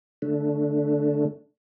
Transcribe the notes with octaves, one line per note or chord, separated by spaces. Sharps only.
D3 A3 D4